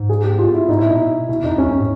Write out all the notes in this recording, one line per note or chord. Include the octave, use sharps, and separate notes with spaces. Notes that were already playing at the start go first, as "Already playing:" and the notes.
Already playing: G#2
G#4
G4
F4
E4
G#2 D#4
A2 E4
A#2 D#4
B2
B2 E4
F2 D#4
E2 C#4
F2
A2